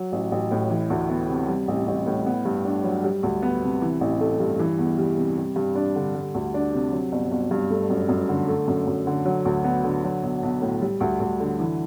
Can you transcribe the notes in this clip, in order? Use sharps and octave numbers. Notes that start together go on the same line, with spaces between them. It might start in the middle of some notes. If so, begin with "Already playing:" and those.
Already playing: F#3
A1
A1
A2
E3
D2
B3
C3
G3
A1
A1
A2
B3
G2
D4
F#3
G3
D2
B3
C3
E3
A1
A3
G2
E3
E2
G3
C3
G3
G2
D4
D3
G3
D2
D4
C3
F#3
G1
G1
G2
A3
F#2
F#2
D3
A3
F#2
F#2
D3
F#3
D2
B3
D3
F#3
B1
B1
A2
G3
D2
D2
D3
E3